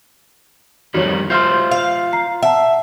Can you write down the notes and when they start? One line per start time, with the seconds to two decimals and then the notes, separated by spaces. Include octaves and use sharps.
0.94 F2 D#3 G3 F#4 C#5
1.30 F4 C5 E5 C6 F6 G6
1.71 F5
2.13 A#5 C7
2.43 E5 F#5 A5